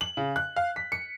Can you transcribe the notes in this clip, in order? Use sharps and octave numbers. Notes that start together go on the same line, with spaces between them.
F#7
C#3
F#6
F5
B6
C#7